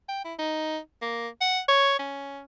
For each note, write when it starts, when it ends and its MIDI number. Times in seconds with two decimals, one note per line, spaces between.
0.08 0.25 79
0.25 0.34 64
0.39 0.78 63
1.02 1.28 58
1.41 1.60 78
1.69 1.98 73
1.99 2.42 61